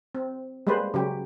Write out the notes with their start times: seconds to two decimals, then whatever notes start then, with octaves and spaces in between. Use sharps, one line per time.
0.15 C4
0.67 G3 G#3 A#3 B4 C5
0.94 C#3 F#3 G4